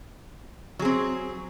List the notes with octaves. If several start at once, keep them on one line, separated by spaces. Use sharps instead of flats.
F#3 C4 G#4